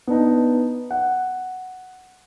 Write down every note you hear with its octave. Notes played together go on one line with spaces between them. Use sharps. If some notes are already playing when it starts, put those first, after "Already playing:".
B3 D4 D#4
F#5